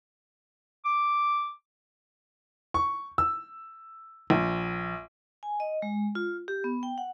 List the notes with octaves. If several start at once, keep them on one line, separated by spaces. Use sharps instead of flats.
D6
C#6
E6
A#1
G#5
D#5
G#3
F4
G4
B3
G5
F#5